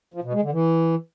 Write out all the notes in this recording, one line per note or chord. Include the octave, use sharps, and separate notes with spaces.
F3
B2
G#3
D3
E3